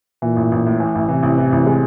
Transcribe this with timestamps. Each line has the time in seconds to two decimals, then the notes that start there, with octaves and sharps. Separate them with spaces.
0.22 A#2 E3
0.36 A1
0.52 A1
0.66 A2
0.80 E3
0.95 A1
1.09 C3 E3
1.23 A1
1.38 E3
1.52 A1
1.66 G#3